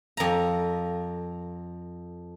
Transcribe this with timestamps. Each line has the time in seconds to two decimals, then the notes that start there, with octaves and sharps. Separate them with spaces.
0.17 F2 A#5